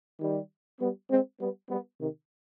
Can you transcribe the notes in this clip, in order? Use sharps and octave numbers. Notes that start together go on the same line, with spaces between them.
D#3 G3
G3 B3
G#3 C4
G3 B3
G3 B3
C3 D#3